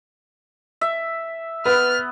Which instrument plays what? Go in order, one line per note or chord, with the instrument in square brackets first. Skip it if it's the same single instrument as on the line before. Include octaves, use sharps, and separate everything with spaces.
[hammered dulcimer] E5
[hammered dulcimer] B3 [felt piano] B4 [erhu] F6